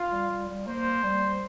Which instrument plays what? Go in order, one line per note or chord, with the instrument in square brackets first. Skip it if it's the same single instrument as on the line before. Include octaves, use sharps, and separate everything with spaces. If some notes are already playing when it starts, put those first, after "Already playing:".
Already playing: [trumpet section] F4
[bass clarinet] G3
G3
G3
[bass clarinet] A#3 [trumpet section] C5
[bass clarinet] G3